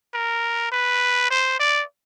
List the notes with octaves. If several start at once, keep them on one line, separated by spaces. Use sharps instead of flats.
A#4
B4
C5
D5